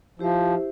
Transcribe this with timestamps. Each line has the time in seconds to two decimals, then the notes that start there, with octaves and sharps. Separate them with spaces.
0.19 F3 E4 G4 C5 E5